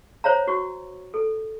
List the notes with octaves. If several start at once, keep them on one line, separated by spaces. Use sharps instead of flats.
C5 C#5 F5 A#5
F#4 C#6
A4